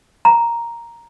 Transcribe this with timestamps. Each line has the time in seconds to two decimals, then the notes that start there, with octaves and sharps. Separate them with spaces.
0.25 A#5